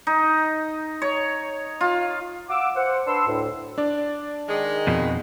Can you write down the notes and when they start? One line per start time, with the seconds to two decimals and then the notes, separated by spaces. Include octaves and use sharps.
0.07 D#4
1.02 C#5
1.81 F4
2.49 F5 F#5 D6 E6
2.76 C5 F#5
3.07 D4 B4 C6 E6
3.27 D2 A2
3.78 D4 D5
4.49 D#3 G#3
4.87 F2 B2